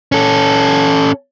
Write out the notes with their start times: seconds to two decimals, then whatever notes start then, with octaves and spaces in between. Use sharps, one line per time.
0.12 C#4 A4